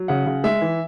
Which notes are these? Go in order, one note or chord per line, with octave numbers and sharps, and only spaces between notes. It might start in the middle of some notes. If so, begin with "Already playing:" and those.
Already playing: F#3
C#3 F#5
C#3
G#3 E5
E3